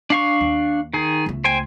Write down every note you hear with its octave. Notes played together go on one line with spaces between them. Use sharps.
D4 F5 C#6
D#2
D#3 G#4
C#2 A3
C5 G5 G#5